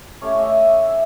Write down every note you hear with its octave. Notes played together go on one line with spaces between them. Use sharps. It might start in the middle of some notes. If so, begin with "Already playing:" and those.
A3 C#4 G4 C#5
D#5 E5 G#5
E5